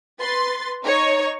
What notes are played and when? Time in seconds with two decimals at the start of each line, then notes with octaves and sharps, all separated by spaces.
0.19 B4 C6 A6
0.84 D#4 C#5